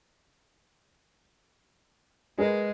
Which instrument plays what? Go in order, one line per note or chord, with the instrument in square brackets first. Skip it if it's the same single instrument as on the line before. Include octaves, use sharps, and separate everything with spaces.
[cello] G#3 [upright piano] G#4 A#4 B4